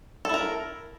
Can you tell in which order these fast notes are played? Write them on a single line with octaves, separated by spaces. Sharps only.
A4 E4 A#4